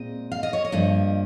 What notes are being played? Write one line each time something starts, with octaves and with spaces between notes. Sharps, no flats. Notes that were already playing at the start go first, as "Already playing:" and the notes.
Already playing: A#2 G#3 C4 D#5
F5
D#5
C#5
D#5
G2 F3 A#3